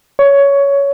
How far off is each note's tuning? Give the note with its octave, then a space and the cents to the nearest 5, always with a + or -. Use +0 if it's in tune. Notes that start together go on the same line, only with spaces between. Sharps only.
C#5 +15